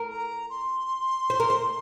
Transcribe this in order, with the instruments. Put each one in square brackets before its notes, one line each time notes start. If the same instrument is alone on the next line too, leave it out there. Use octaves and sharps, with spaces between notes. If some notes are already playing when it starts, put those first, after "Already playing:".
Already playing: [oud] A#4
[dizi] A#5
C6
[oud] C5
A#4
C5